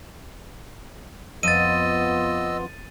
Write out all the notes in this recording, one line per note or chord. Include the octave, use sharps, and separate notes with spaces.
F2 B3 F4 D#5 E6 A6 D#7